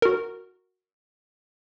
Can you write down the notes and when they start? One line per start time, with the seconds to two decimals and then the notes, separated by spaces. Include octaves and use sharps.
0.02 F#4 A#4